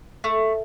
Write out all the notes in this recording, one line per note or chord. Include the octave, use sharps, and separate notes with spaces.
A3